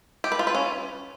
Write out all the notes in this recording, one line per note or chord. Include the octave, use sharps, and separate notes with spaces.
G4
B4
F4
B4
C#4